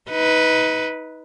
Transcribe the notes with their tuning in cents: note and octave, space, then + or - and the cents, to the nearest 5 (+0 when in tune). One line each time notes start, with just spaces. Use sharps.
D#4 +30 B4 +0